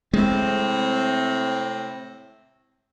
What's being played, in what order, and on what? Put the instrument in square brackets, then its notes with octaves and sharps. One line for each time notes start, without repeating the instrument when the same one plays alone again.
[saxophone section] A2 C3 C4 [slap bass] G#3